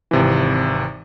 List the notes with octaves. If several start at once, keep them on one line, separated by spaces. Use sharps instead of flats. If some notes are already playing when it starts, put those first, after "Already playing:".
G#1 C3 E3